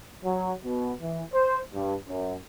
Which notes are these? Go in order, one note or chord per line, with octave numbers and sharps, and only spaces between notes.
F#3
B2
E3
C5
G2
F#2